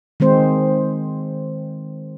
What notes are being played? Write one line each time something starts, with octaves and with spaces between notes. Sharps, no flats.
D#3 G#3 C4 C5